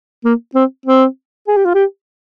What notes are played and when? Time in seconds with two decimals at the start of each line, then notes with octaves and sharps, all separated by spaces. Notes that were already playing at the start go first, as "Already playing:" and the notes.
0.25 A#3
0.55 C4
0.86 C4
1.48 G#4
1.57 G4
1.65 F4
1.74 G4